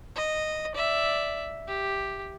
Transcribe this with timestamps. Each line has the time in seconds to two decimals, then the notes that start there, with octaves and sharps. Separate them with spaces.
0.16 D#5
0.75 D5 E5
1.67 G4